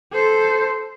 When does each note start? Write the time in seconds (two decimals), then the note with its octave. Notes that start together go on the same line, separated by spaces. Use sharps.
0.13 A4 C5